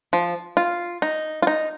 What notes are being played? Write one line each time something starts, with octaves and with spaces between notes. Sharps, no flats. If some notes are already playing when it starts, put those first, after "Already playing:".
F3
F4
D#4
F4
D#4